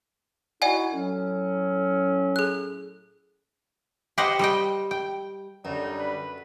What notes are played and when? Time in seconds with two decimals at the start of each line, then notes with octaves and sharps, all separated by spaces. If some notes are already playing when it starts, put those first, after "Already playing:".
0.62 D#4 E4 F#4 D5 F#5 G#5
0.93 A2 F#3 C#4
2.36 G#4 F#6
4.18 G4 B4 C5 D#5 F#5 G5
4.39 G3 D#5 G5
4.91 G5
5.65 F#2 D3 G3 D#4
5.99 B4